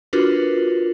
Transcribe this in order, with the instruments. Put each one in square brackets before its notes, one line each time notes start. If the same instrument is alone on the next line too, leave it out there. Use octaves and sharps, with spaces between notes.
[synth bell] D4 F4 F#4 A#4 B4